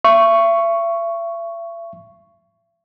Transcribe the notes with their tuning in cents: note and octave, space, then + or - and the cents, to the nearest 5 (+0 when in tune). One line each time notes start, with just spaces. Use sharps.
E5 +40 C#6 +0